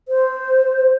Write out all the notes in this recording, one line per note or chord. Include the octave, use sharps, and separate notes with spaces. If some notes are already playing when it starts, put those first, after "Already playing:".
C5